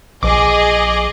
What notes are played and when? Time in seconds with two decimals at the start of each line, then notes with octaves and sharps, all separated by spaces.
0.23 A#1 F3 G#4 D#5 D6